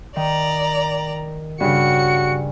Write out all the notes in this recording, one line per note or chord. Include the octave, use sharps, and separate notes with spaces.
D#3 D5 A#5
G2 C#3 F#4 C#7